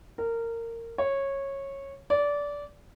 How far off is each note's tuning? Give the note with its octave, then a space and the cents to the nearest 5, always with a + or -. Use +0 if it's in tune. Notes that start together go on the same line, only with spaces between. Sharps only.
A#4 -20
C#5 -15
D5 -20